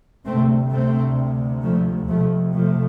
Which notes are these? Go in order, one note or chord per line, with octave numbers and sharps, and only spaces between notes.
D2 C3 A3 C4
A3 C4
F3 A3
F2 C3 F3 A3
F3 A3